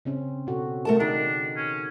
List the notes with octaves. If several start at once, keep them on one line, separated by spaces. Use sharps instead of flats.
C#3 C4 C#4
B2 F#4 A4
A3 A#4 A5
D#3 D4 D#4 G#4 D#5
C#4